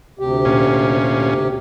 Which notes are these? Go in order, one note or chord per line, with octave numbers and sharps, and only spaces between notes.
D2 C3 G4
A#2 C#4